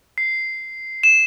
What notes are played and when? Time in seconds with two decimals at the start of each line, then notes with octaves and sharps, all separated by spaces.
0.18 C7
1.03 E7